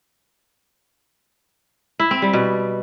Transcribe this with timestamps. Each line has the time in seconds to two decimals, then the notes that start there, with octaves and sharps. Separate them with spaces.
2.00 E4
2.11 C4
2.22 G3
2.33 B2